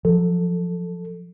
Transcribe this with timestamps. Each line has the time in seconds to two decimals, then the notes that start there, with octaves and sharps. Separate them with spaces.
0.05 F3 F#3 A4